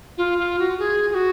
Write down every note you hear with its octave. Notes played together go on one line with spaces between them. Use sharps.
F4
F4
F#4
G#4
G#4
F#4